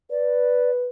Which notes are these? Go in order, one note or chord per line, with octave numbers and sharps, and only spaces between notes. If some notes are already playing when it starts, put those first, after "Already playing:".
B4 D5